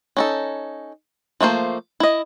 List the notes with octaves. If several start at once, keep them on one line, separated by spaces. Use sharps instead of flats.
C#4 D#4 A4
F3 A3 A#3 C5
E4 D#5